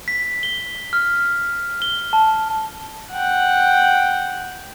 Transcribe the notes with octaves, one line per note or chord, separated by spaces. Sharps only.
B6
G7
F6
G7
A5
F#5 G5